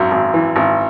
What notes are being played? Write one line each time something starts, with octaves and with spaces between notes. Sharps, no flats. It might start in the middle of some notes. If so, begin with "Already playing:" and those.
Already playing: G#1 F#2
G#1
E3
G#1